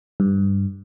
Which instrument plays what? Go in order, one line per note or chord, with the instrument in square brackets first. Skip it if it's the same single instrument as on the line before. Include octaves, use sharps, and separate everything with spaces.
[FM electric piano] G2